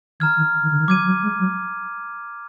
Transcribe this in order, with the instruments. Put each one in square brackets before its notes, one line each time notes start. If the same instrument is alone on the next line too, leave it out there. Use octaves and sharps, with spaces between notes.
[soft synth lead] D#3 [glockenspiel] A#5 F6 G#6
[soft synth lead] D#3
D#3
D3
D#3
[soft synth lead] F#3 [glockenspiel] D6 G#6 D#7
[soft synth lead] F#3
G#3
F#3